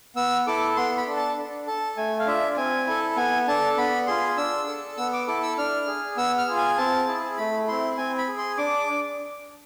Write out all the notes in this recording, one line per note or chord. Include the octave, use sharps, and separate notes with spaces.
B3 E6
E4 A4 D6
B3 C6
B5
D4 A4
A5
D4
A4 A5
A3 G#5
F5
D4 F4 E5
C4 G#5
E4 A4
B3 G#5
D4 A4 A5
B3 B5
F4 G#4 C6
D4 E6
A4
B3 E6
D6
E4 A4 D6
E6
D4 F6
G#4
B3 E6
F6
F4 G#4
G#5
C4 A5
E4 G#4
A3 B5
C4 E4 C6
C4 G#5
B5
G#4
C6
D4 D6